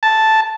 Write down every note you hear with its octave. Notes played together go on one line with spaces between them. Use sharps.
A5